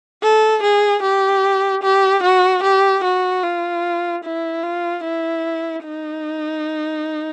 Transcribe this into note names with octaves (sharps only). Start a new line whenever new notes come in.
A4
G#4
G4
G4
F#4
G4
F#4
F4
E4
F4
E4
D#4